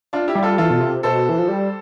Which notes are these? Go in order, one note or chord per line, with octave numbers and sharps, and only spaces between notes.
D4 F4
E4 G4
G3
F4 A4
E3 F4 A4
B2
C3
B2 A4 C5
E3
F3
G3